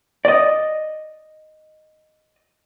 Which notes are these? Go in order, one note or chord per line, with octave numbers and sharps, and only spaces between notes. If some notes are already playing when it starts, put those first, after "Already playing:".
D5 D#5